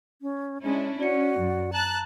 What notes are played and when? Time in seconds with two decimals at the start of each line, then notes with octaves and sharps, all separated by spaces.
0.22 C#4
0.64 G#3 C#4 D4 E4
1.00 C#4 F#4 D5 C#7
1.39 F#2
1.73 A5 A#5 F#6